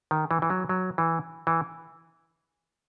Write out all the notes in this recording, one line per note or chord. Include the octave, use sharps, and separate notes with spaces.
D#3
E3
E3
F#3
F#3
E3
E3